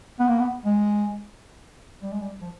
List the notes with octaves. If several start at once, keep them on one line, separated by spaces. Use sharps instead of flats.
B3
A#3
B3
G#3
G3
G#3
G3
F3